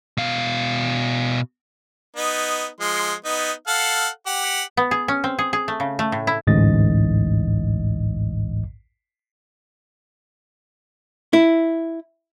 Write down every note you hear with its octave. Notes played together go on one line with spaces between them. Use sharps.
B2 F5
B3 D#4
F3 G#3 C6
B3 D#4
A4 F5 F#5
G4 F#5
B3
G#4
C#4
C4
G#4
G#4
A3
C#3
A3
A2
E4
A1 D2 G#2 D#5 A6
E4